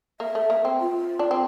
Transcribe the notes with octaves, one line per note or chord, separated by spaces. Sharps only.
A#3 E5
A3
A#3
C4
F4
D4
C4